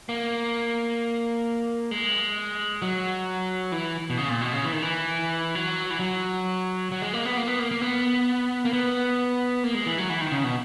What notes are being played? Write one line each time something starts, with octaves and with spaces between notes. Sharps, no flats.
A#3
G#3
F#3
E3
B2
C#3
A#2
B2
C#3
E3
D#3
E3
F#3
E3
F#3
F#3
G#3
A#3
B3
A#3
B3
A#3
A#3
B3
A#3
B3
A#3
G#3
E3
F#3
E3
D#3
C#3
B2